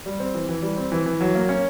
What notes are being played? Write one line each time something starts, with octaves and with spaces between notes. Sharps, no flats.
G3
C4
E3
E3
G3
C4
E3
E3
F#3
A#3
C#4